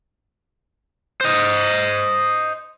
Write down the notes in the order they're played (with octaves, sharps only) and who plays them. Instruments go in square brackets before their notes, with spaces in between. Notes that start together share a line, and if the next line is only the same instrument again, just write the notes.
[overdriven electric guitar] C5 D#5